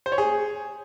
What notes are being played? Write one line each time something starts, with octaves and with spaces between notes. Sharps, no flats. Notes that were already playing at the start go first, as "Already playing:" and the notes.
C5
C#5
G#4